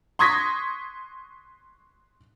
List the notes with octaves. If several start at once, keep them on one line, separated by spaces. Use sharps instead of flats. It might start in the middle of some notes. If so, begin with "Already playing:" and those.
C6 C#6 D#6 G#6 A#6 B6